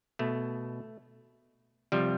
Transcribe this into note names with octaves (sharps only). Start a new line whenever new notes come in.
B2 A3
C3 F3 G3